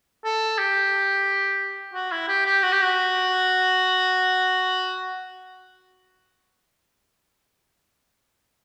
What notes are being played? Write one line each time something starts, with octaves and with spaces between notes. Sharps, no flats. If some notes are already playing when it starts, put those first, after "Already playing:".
A4
G4
F#4
E4
G4
G4
F#4
G4
F#4